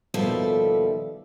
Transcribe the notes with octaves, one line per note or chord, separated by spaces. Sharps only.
D#2 B2 F3 G3 A4 E5